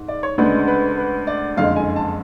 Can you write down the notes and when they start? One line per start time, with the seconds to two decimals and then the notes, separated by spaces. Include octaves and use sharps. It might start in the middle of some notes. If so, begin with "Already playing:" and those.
Already playing: G#2
0.08 D5
0.23 C#5
0.38 D2 C#3 G#3 D4 B4
0.68 B4
0.98 B4
1.27 D5
1.57 F#1 F2 D3 G#3 F5
1.76 G#5
1.96 A5